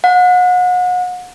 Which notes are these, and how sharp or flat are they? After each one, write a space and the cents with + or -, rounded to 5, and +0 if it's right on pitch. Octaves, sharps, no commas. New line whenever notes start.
F#5 -35